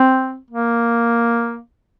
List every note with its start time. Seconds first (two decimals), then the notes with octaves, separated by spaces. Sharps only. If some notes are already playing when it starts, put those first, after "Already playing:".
Already playing: C4
0.51 A#3